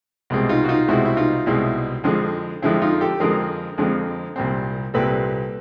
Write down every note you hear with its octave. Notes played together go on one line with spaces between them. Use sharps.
C2 B2 G#3 C4
D#4 F4
F#4
D#4 F4
C2 B2 G#3 C4 E4 F#4
E4
D#4 F4
C2 B2 G#3 C4 E4
F2 D3 F3 G#3 C4
F2 D3 F3 G#3 C4 E4
D#4 F4
G4 A4
F2 D3 F3 G#3 C4 G#4 A#4
F2 D3 F3 G#3 C4
C2 A#2 G3 C4
C2 A#2 G3 C4 A4 B4